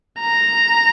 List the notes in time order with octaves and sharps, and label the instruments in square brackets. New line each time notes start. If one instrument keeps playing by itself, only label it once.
[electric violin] A#5